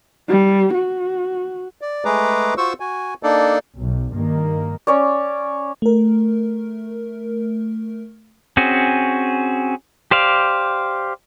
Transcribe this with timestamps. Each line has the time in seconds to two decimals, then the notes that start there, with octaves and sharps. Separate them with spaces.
0.28 G3
0.74 F#4
1.81 D5
2.05 G#3 A3 G#4 B4 A#5 D6
2.58 F4 F#4 C5 C#6 E6
2.80 F#4 G#5
3.23 A#3 D4 D#4 A4 D5
3.77 B1
4.13 G2 D#3 A#3
4.87 C#4 C#5 D5
5.82 A3 A#4
8.57 C4 C#4 F#4 G#4
10.11 G4 C5 D5 F5